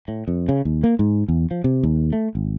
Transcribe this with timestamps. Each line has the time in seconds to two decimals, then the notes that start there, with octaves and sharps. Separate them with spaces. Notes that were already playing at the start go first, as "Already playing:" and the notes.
0.08 A2
0.28 F2
0.49 C#3
0.65 D#2
0.84 A#3
0.99 G#2
1.28 E2
1.51 F3
1.64 C3
1.83 D#2
2.13 A3
2.35 G#1